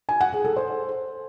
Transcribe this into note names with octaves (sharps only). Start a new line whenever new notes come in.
G#5
F#5
G#4
A4
C5